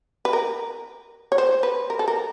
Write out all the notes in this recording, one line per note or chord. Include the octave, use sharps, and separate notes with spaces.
B4
A#4
C#5
C5
B4
A#4
A4
A#4